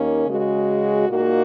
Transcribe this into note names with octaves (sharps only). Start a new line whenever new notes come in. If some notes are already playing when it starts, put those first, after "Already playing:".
Already playing: D#2 D#3 A#3 C#4
C#3 G#3 F#4
A#2 A#3 D#4 F#4